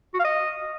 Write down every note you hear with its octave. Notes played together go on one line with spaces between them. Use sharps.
F#4
F5
D#5